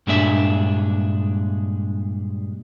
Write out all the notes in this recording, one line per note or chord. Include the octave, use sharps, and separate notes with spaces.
G2 A#2 G#3 D4 E5